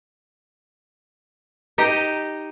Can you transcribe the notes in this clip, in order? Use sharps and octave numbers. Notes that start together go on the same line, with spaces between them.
D#4 G4 D#5